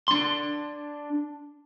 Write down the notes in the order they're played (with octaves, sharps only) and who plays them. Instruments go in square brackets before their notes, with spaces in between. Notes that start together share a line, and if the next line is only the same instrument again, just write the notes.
[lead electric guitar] D4 C6